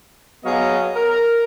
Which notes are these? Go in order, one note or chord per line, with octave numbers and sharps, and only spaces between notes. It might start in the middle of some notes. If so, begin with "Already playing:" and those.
F#3 B3 G#4 C#5 D#5 F5
A#4